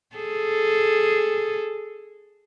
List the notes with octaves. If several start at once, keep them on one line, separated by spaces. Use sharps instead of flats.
G#4 A4